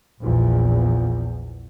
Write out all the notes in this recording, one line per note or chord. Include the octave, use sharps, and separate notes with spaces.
A#1 E2 A#2